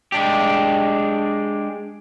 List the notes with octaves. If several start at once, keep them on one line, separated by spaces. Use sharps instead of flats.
G#3 D4 G4